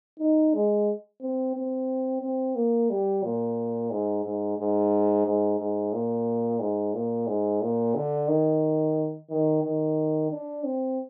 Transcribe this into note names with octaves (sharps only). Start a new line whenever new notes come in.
D#4
G#3
C4
C4
C4
A#3
G3
A#2
G#2
G#2
G#2
G#2
G#2
A#2
G#2
A#2
G#2
A#2
D3
D#3
D#3
D#3
D4
C4